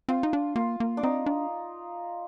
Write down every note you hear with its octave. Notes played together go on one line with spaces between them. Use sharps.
C4 F4
D#4
D4
A#3 F4
A#3
D4
C4 D#4
D4